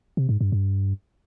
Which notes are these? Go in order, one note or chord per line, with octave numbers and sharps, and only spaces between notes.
C3
G#2
G2
G2